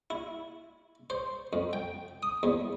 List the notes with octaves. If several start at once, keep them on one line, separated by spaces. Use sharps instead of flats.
E4
C5
F2
G5
D#6
E2